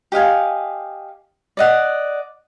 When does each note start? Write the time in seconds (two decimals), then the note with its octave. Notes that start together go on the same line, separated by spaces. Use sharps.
0.12 G4 D#5 F5 G#5
1.57 D5 D#5 F#5